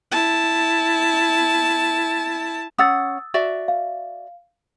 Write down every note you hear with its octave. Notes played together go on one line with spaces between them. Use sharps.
E4 A5
C#4 F#5 D#6 E6 A6
F#4 D5 E5
F5